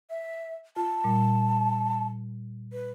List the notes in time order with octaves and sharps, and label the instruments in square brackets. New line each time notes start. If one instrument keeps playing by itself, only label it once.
[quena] E5
[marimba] F4 [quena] A5
[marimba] A#2 G3
[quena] B4